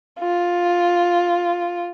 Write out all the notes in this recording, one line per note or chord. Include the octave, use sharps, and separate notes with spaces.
F4